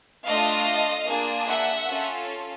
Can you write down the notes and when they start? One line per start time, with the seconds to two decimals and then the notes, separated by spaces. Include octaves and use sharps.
0.26 A3 D4 F4 D#5 F5
1.07 A#3 D4 F4 G#4
1.47 E5 F#5
1.87 C#4 F4 A4